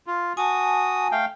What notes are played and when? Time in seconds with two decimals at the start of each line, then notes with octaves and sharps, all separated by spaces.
0.07 F4
0.37 F#4 G#5 A5 D#6
1.12 A3 F5 G5